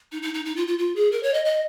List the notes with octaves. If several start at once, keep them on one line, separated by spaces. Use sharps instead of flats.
D#4
D#4
D#4
D#4
F4
F4
F4
G#4
A#4
C#5
D#5
D#5